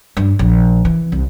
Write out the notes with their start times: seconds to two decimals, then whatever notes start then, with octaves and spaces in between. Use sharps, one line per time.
0.17 G2
0.39 A#1
0.85 E3
1.12 C2